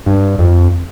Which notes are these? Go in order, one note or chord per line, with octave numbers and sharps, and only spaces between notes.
G2
F2